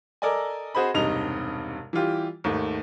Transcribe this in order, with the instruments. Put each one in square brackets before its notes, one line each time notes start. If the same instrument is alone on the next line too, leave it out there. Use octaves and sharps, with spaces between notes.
[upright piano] A4 A#4 D5 D#5 G#5
C4 F#4 G#4 C5 D#5 B5
E1 G2 C3 D#4 D#5 F7
E3 G3 F4 G4
D#2 G#2 D#3 A3